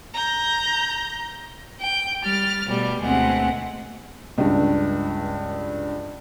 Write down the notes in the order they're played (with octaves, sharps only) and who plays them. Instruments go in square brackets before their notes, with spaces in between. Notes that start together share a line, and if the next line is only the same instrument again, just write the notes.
[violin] A#5 G6
[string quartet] G5
G3 F6 A6
B2 G3 A3
D2 B2 G#3 A3 C4 F#5
[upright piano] C#2 G2